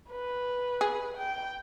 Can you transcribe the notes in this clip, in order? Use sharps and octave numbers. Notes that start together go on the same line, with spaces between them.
B4
G#4
G5